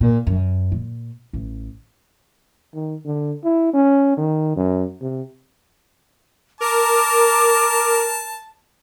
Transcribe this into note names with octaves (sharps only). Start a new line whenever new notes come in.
A#2
F#2
A#2
A1
D#3
D3
E4
C#4
D#3
F#2
C3
A#4 A5 D6